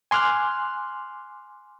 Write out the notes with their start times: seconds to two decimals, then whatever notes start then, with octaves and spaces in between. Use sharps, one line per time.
0.11 G#5 C6 D6 F6 F#6